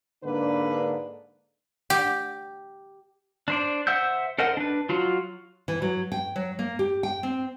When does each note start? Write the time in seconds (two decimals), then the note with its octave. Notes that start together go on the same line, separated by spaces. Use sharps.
0.24 G#2 D3 A#3 D4 B4
1.90 G4
3.48 D4 C5 D5
3.87 C5 E5 F#5 E6 G6
4.39 A4 A#4 C5 D#5 F#5
4.57 D4 B4
4.89 F#3 F4 F#4
5.68 E3
5.82 F#3
6.12 G5
6.36 F#3
6.59 A#3
6.79 G4
7.03 G5
7.23 C4